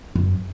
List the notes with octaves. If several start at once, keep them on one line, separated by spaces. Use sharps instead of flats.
F#2